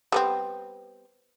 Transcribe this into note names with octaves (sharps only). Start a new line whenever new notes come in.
G3 B3 C4